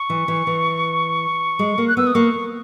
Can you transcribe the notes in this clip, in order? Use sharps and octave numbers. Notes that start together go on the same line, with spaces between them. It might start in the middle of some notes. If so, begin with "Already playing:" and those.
Already playing: C#6
E3
E3
E3
G#3
A#3
F#6
B3 E6
D#6
A#3 C#6